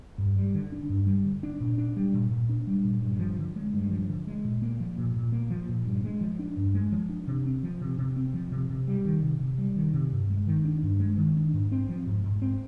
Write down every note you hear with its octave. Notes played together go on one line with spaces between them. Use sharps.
G2
G3
D3
D4
G2
G3
D3
D4
A#2
D4
G3
A#2
A#2
D4
G3
A#2
G2
F3
D3
G#3
G2
F3
D3
G#3
A#2
A#3
F3
A#2
A#2
A#3
F3
A#2
G2
G#3
F3
D4
G2
G#3
F3
D4
C3
C4
F3
C3
C3
C4
F3
C3
C3
G3
D#3
C3
C3
G3
D#3
C3
G2
G#3
D#3
D4
G2
G#3
D#3
D4
G#2
C4
F3
G#2
G#2
C4